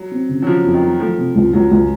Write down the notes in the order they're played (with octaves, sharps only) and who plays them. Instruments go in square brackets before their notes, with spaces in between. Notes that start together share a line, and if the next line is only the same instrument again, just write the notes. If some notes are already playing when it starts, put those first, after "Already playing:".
Already playing: [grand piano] F#3
[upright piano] C4
C#3
[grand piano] F#3
[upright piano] C#3 [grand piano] F3
[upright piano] F2
[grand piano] D#3
[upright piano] F#3
[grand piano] F3 [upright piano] A3
[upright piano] C3
C#2
[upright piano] C#2 [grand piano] F#3
[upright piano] C#2